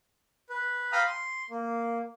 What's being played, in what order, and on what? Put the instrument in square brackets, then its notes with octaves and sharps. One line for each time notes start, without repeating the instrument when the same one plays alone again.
[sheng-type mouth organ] B4
F5 G5 A#5 B5 D#6 F6
C6
A#3